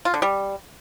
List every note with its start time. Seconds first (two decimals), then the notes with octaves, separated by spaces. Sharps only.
0.05 F4
0.14 D3
0.22 G3